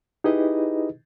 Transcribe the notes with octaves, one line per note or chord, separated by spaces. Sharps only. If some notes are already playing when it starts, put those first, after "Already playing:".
D#4 E4 G4 G#4 B4 D#5